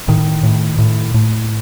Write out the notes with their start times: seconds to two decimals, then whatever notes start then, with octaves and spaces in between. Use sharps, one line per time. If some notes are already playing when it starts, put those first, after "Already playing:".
0.08 A2 D#3
0.43 A2
0.78 A2
1.14 A2